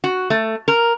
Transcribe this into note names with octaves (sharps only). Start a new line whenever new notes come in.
F#4
A3
A#4